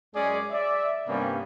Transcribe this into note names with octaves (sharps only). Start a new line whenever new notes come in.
F#2 G#3 C#4 G#4 D5
D5 E5
G2 C3 G3 A#3 B3 C#4